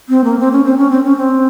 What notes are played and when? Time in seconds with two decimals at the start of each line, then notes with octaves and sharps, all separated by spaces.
0.09 C4
0.24 A#3
0.40 C4
0.52 C#4
0.65 C4
0.78 C#4
0.91 C4
1.04 C#4
1.17 C4